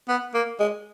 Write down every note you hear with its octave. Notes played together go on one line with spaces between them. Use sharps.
B3
A#3
G#3